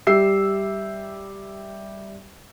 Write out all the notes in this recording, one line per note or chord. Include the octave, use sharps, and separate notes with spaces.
G3 G4 E5 E6 C7